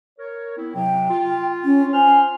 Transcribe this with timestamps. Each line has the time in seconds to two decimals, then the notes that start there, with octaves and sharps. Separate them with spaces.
0.19 A#4 C#5
0.57 B3 C4 E4
0.75 C3 F#3 G5
1.10 F4
1.65 C#4
1.93 C5 G#5 C6 F6